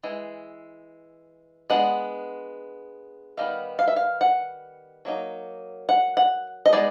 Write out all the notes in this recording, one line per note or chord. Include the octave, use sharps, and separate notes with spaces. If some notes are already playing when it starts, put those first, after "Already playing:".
E3 G#3
G#3 B3 D4 F#5
D#3 G3 B3 D#4 F5
F5
E5
F5
F#5
F#3 A#3 D#4
F#5
F#5
D#5
G#3 B3 D#4 D5